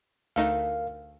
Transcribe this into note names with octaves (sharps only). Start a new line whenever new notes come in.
D2 A3 D#4 A#4 F5